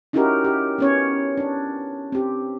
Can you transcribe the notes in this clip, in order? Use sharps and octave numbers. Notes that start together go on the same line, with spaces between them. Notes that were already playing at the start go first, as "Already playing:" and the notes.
C#4 D#4 E4 F#4 G4 A#4
G4
B3 C#4 C#5
D4
C4 G4